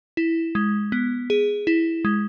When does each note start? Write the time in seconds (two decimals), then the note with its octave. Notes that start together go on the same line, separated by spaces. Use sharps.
0.17 E4
0.55 G#3
0.92 B3
1.30 G#4
1.67 E4
2.05 G#3